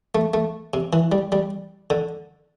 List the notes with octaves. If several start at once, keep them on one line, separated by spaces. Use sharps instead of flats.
A3
A3
C3
E3
G3
G3
D3